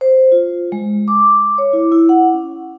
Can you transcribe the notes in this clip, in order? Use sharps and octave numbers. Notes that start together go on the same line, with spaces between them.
C5
F4
G#3
D6
C#5
E4
E4
F#5
C#4